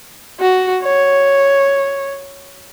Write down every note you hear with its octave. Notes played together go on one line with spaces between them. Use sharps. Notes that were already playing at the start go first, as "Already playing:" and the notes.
F#4
C#5